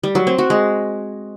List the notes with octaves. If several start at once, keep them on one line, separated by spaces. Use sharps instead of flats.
G3
F#3
C4
F#4
G#3